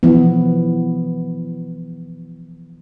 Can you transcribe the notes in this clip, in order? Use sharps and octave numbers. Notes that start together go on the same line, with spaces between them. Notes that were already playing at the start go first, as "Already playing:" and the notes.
E3 F3 B3